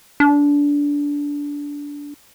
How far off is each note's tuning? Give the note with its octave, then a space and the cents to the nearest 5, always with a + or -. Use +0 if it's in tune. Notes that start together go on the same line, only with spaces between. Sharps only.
D4 -20